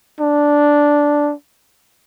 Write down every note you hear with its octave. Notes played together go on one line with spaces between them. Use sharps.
D4